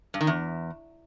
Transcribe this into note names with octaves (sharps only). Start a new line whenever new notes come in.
G2
D#3
E2